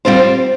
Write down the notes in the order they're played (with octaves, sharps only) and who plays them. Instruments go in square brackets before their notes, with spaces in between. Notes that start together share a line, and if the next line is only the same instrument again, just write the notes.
[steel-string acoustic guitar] G3 C4 F4 C5